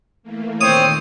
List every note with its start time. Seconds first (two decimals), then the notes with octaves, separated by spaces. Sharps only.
0.23 E3 A3 A#3
0.61 D#2 A#2 D#3 C4 C#5 D#6